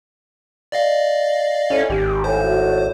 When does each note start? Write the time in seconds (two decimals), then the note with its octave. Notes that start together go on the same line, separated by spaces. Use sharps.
0.72 D5 D#5 F5
1.70 A2 C#4 G#5
1.90 G#1 G4
2.24 A2 C5 G#5
2.43 F#4